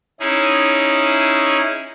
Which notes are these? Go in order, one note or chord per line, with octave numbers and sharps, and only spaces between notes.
C#4 D#4 E4 G#4